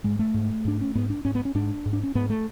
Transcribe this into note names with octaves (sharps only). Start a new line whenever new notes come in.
G#2 G#3
A3
G#2
G#2 D4
C#4
G#2 B3
D4
G#2 C#4
B3
C#4
G#2 D4
G#2
D4
C#4
G#2 B3
A3